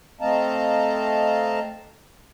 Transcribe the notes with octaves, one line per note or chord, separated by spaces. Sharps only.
A3 C4 D#5 F5 A5 A#5